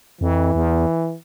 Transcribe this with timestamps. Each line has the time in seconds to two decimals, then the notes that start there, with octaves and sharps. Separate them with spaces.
0.21 F2 E3
0.55 E2